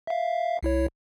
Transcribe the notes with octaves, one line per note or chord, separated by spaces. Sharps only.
E5 F5
C2 E4 C#5